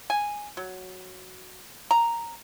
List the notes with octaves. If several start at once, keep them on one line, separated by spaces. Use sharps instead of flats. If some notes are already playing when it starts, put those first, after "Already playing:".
G#5
F#3
A#5